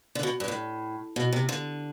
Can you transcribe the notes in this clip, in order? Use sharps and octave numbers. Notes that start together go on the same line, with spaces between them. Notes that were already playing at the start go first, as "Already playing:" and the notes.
D3
B2
G2
A2
B2
C3
D3